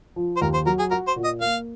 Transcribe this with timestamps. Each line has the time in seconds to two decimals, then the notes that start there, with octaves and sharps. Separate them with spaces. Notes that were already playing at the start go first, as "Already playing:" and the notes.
0.16 F3
0.37 C5
0.41 D#2 A#4
0.54 C5
0.66 F#3 A#4
0.79 G#4
0.91 F#4 A#4
1.07 C5
1.16 A#2
1.24 D#5
1.41 A#3 F5